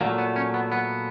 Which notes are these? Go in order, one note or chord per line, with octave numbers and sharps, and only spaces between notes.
A#2 F#3 A3 A#3
B3
C#4
B3
B3